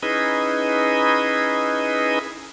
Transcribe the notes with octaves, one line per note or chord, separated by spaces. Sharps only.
C#4 D#4 E4 G#4 B4 D#5